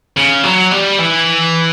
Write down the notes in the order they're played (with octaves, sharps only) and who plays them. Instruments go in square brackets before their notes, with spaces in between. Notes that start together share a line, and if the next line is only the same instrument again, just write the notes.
[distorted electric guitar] C#3
F#3
G3
E3